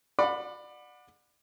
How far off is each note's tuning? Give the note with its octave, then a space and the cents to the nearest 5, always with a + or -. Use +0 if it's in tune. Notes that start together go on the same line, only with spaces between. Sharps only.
D5 +25 F#5 -25 B5 +5